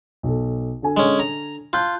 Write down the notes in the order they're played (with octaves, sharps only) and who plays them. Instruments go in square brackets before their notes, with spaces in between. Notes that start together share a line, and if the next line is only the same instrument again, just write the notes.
[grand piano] B1 A4
D3 A4 G#5
[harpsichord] G#3 C#4
A#5
[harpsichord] F4 [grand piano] A5 F#6 G6